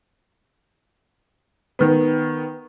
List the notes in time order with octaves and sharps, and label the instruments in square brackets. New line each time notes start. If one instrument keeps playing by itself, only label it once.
[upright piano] D#3 B3